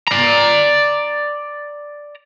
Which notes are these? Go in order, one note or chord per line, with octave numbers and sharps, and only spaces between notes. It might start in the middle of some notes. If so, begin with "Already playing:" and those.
D5 A#5